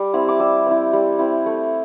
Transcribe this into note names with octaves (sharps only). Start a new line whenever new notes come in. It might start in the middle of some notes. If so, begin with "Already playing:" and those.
Already playing: G3 D6
C4 E4
D6
G3 E6
C4 E4
G3
C4 E4
A3